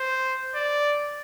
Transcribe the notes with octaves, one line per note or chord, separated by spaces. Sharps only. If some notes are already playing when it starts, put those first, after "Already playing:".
Already playing: C5
D5